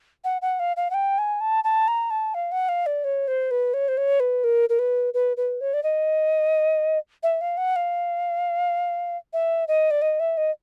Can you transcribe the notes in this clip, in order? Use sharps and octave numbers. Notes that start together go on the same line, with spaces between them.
F#5
F#5
F5
F5
F#5
G5
G#5
A5
A5
A#5
A5
F5
F#5
F5
D5
C#5
C5
B4
C#5
C5
C#5
B4
A#4
A#4
B4
B4
B4
C#5
D5
D#5
E5
F5
F#5
F5
E5
D#5
D5
D#5
E5
D#5